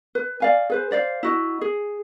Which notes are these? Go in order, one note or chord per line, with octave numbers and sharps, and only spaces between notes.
B4
D5 F5 G#5
G#4 B4 C5
C5 D5 D#5 F5
E4 F#4 D#5
G#4